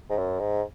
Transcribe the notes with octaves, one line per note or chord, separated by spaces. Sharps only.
G#2
F#2
G#2